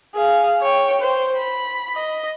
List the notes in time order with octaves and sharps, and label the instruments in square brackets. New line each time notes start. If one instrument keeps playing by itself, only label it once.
[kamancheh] G#4 F5
C#5 G5
C5
B5
D#5